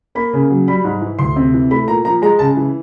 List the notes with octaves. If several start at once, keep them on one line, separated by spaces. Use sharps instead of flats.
A#3 B5
C#3
F#3
G3 B5
G#2
E3
D2 C6
C3
E3
A3 B5
A#2 A#5
F3 A#5
G#3 A#5
C#3 A5
E3